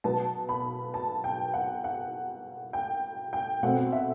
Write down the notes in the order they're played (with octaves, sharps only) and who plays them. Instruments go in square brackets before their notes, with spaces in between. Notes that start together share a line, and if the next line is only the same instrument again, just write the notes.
[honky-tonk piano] B2 F#3 B3 A5
B5
A5
G5
F#5
F#5
G5
G5
B2 A3 C4 F#5
E5